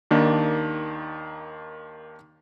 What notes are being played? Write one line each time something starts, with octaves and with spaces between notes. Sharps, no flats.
D#2 D#3 A#3 D4 D#4